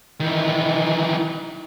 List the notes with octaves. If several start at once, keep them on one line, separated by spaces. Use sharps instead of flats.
D#3 E3